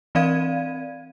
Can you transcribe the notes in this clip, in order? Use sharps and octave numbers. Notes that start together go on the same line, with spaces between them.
E3 C4 D5 F5 G#6 D#7